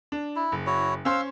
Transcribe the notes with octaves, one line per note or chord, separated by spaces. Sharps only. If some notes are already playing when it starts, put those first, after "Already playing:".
D4
E4
F#1
E4 F#4 C#5
C#4 C5 F5 C6 E6